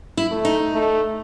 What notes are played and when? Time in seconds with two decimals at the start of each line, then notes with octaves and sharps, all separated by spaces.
0.17 E4
0.32 A3
0.45 D#4
0.73 A3